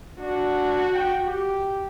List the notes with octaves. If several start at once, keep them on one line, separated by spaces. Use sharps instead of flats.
D4 F#4
G5
G4